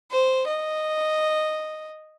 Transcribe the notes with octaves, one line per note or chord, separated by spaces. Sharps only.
C5
D#5